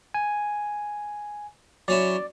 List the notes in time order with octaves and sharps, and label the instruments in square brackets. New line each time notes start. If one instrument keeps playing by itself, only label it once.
[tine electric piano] G#5
[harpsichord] F#3 C#4 E4 [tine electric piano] D5